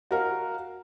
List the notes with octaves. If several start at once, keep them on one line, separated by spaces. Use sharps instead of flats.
F#4 A#4 F5